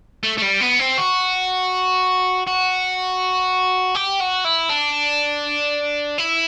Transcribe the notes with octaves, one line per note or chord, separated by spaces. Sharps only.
A3
A3
G3
B3
C4
F#4
F#4
G4
F#4
E4
D4
E4